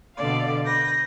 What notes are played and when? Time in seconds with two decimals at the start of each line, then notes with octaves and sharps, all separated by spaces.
0.15 B2 D3 A4 D5 F5
0.63 B4 G6 A#6